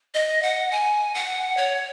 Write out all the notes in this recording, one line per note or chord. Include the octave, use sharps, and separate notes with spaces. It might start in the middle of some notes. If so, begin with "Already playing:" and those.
D#5
F#5
G#5
F#5
C#5